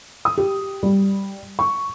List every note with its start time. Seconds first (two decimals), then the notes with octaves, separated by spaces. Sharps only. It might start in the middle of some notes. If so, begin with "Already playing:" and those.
0.25 D#6
0.38 G4
0.83 G3
1.59 C#6